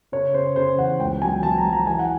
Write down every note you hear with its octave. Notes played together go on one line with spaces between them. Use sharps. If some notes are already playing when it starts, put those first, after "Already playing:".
C#3 C#5
C#3 C5
C#3 C5
E2 F#5
C#2 G5
F#3 G#5
F#3 A5
A#5
F#3
A#5
E3 G#5
F#5